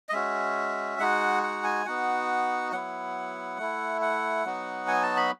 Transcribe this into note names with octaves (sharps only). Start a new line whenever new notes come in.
D#5
G#3 C#4 F#4 E5
G#3 D#4 F#4 F#5
F#5
G#5
B3 D#4 F#4 F#5
F#3 B3 E4 F#5
A3 E4
F#5
F#3 B3 D#4 F#4
G#5
A5
B5